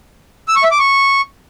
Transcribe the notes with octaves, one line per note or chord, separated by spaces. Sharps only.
E6
C#6
E5
D6
C#6